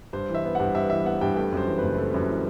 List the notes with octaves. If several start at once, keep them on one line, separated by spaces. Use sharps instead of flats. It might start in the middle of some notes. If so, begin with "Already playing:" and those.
G2 C5
E3
E5
B3
G2 F#5
G2 E5
E3 E5
B3 F#5
G2 G5
A3 G5
F#2 C5
E3
F#1 B4
A3
F#2
E3